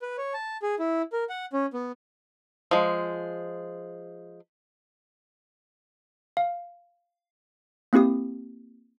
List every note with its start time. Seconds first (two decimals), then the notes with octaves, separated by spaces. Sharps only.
0.02 B4
0.18 C#5
0.34 A5
0.62 G#4
0.79 E4
1.13 A#4
1.29 F#5
1.53 C#4
1.74 B3
2.71 F3 G#3
6.37 F5
7.93 A#3 C4 E4 G4 D#6